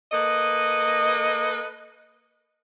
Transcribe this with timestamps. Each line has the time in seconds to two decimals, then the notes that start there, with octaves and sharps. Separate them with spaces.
0.12 A#3 A4 B4 D#5